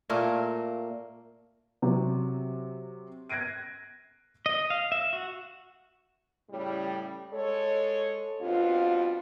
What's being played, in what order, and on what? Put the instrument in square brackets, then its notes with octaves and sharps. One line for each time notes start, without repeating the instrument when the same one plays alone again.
[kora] A#2 A3 A#3 A#4
[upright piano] C3 F#3
F#6 G#6 A#6 C7 D7 D#7
[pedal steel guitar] D#5
F5
E5
F#4
[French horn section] A2 C#3 G3
G#3 A4 C#5
G2 B2 C4 F4